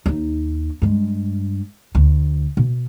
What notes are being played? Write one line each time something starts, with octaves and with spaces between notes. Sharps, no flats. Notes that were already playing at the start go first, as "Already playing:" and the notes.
D#2 D#4
G2 G#3
D2
B2